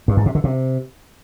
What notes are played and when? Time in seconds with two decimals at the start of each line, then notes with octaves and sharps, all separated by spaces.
0.08 G2
0.17 G#2
0.26 C3
0.35 D3
0.44 C3